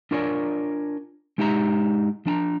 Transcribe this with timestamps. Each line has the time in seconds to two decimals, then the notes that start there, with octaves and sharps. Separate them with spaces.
0.11 D4 F4 A#4 C#5 D5 G#5
1.38 G#3 D#4 G4 E5 A#5
2.26 F3 D4 A5 A#5